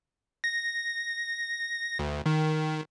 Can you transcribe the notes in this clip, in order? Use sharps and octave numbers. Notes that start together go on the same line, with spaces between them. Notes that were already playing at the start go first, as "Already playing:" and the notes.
A#6
D2
D#3